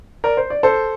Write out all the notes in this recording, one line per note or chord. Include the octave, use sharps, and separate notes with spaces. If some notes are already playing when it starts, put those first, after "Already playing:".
A#4 D5
C5
D5
A4 C5